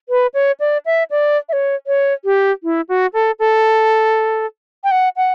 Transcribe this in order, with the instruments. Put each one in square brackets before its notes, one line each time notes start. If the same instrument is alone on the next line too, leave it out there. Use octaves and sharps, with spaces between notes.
[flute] B4
C#5
D5
E5
D5
E5
C#5
C#5
G4
E4
F#4
A4
A4
G5
F#5
F#5